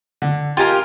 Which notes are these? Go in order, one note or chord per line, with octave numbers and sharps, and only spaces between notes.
D3
F4 G4 A#4 G5 G#5 A#5